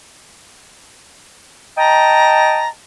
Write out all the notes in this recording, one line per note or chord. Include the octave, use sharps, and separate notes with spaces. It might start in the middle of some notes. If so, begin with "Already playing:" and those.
D#5 G5 A5 A#5